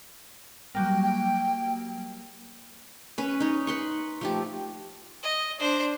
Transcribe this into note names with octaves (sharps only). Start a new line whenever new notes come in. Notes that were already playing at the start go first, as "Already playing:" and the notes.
F#3 G3 A#3 G5
G5
C#4 B4
D#4 C#5
B4 C6 C#6
F3 A3 G4
D#5
D4 C5